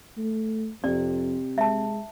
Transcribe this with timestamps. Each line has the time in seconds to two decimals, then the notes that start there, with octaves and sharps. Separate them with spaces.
0.18 A3
0.84 F2 C3 D5
1.58 G#3 E5 A5